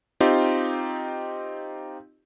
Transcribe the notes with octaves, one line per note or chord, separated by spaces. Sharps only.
C4 D#4 F4 G4